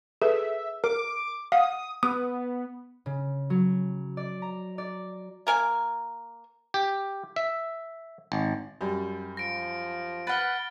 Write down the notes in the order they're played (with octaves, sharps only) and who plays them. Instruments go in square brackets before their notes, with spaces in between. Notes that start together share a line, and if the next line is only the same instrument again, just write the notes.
[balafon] G#4 B4 [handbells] A4 [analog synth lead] E5
[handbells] A#4 [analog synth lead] D6
[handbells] F5 [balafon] F#5 [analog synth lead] D#6
[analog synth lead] B3 [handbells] D#6
[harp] C#3
F#3
D5
A#5
D5
[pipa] A#3 A#4 G#5
[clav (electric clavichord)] G4
E5
G#1
[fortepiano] F#2 G3
[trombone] F3 [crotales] A#6 D7
[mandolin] B4 F#5 [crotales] F6 A6